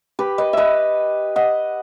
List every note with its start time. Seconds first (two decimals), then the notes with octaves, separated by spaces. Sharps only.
0.19 G4 B4
0.38 B4 D#5
0.53 B4 D#5 E5
1.36 D#5 F#5